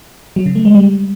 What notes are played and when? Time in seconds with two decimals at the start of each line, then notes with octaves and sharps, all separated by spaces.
0.36 F#3
0.46 C#3
0.55 A3
0.65 G#3
0.75 G3